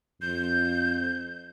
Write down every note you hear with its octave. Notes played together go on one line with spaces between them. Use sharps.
F2 G6